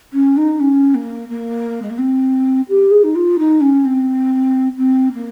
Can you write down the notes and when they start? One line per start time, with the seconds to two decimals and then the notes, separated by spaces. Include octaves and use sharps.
0.12 C#4
0.36 D#4
0.59 C#4
0.94 A#3
1.28 A#3
1.81 G#3
1.90 A#3
1.98 C4
2.68 G4
2.91 G#4
3.03 D#4
3.15 F4
3.38 D#4
3.60 C#4
3.84 C4
4.77 C4
5.12 A#3